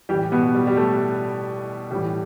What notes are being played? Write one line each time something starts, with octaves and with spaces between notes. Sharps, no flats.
A2 E3 G3 G4
B2 B3
G3
G3
A3
A2 E3 G3